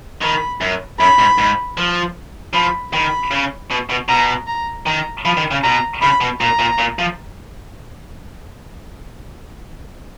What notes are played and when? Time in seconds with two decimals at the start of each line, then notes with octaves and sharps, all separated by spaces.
0.22 D#3 B5
0.61 F#2
1.00 F#2 B5
1.19 G#2
1.38 G#2
1.77 F3
2.54 F3 B5
2.93 D#3 B5
3.31 C#3
3.71 B2
3.90 B2
4.09 B2 A#5
4.47 A#5
4.86 D#3 A#5
5.25 F3 B5
5.37 D#3
5.51 C#3
5.63 B2 A#5
6.02 C#3 B5
6.21 B2
6.41 A#2 A#5
6.59 A#2
6.79 A#2
6.99 F3